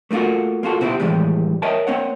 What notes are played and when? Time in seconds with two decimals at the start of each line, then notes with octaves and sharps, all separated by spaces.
0.11 A3 A#3 D#4 F4 F#4
0.63 A#3 F4 F#4 A4
0.81 B2 C4 E4 F4 G4
1.00 A2 D#3 E3 G3 G#3
1.62 A#4 C#5 D#5 E5 G5 A5
1.87 A#3 C4 C#5 F#5